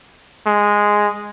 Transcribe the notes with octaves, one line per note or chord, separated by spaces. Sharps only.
G#3